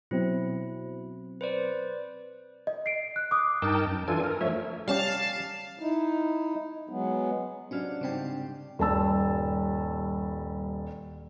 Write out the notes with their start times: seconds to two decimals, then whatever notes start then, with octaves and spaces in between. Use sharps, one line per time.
0.11 B2 F#3 C4 E4
1.41 B4 C5 D5
2.67 D#5
2.86 C7 D7
3.16 F#6
3.31 D6 D#6
3.62 G2 D#4 A#4 G5 A5
3.87 F#2
4.08 E3 D4 F4 A4 G#5
4.24 A#4
4.41 F3 A3 C#5 E5
4.88 G3 C#4 G4 F5 A5
5.79 D#4 E4
6.89 F#3 G#3 B3
7.71 C3 F#3 C#4 D4 F5
8.01 G#2 C#3 G3 G#3 C4 G5
8.79 D#1 G2 A5 E6